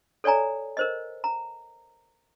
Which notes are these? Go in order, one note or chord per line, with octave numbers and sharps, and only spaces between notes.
A4 C#5 D5 G#5 A#5
A#4 C5 D#5
A#5